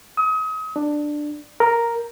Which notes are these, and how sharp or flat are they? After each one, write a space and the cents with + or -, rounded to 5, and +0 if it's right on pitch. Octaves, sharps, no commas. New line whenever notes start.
D#6 +35
D4 +10
A#4 +0